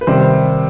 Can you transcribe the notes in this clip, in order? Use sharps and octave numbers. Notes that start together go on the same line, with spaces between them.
B4
C3 D#3 G3 C5